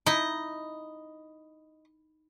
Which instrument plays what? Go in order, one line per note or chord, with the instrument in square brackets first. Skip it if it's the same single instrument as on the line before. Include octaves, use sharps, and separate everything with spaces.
[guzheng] D#4 E4 [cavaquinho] D#5